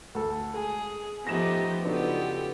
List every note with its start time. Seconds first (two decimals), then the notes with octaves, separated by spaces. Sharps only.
0.15 D2 A4
0.54 G#3 G#4
1.27 F3 A3 B3 D#4 G4 A#6 E7
1.85 C#3 F#3 B3 D4 D#4 F4 G4 A4